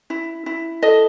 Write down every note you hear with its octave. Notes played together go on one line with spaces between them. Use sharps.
E4
E4
A4 D#5